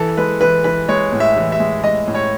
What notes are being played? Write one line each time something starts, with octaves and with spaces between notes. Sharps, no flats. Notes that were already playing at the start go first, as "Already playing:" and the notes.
Already playing: E3 A4
G#3 B4
E3 B4
E3 B4
G#3 C#5
A2
E5
E3
E5
G#3
G#3 D#5
A2
C#5